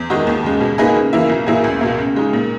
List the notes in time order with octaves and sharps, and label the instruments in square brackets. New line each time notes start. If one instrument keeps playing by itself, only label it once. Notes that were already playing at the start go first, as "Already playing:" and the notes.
Already playing: [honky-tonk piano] E2
D#3 G#3 D#4 F#4
D#2
C#3 G#3
B2
A#3 D#4 G#4 B4
C#3
E3 A#3 E4
B1
A#2 A#3 E4 G#4
C#2
B2 A#3
C#3
G#3 D#4
A#2